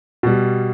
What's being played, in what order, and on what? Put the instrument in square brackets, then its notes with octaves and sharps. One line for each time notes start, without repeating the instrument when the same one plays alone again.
[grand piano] B2 G3